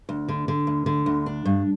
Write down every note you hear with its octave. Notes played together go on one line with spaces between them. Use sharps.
D2
D3
D3
D2
D3
D2
D4
G2